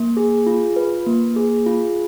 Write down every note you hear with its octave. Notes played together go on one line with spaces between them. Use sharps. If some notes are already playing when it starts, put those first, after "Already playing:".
Already playing: A#3
G#4
F4
B4
A#3
G#4
F4